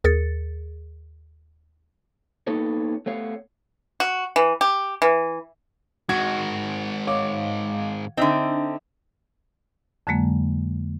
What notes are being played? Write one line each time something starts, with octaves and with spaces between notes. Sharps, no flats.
D#2 G#4 A#4 A6 C#7
A#3 B3 D#4 A4 C#5
A3 B3 C#5 F5
F#4
E3
G4
E3
G#2 D#3 F#4 G#6
C#5 F5 D6
D3 C4 D4 D#4 E5
F2 D3 F#3 G#3 A#3